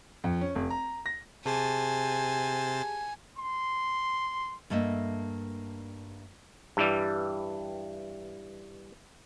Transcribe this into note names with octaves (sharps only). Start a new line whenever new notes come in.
F2
C#4
F1
A#5
A#6
C3 G4 G#4 C5 G#5 A5 A6
C6
G2 A3 A#3 D#5 E5
G2 E3 G3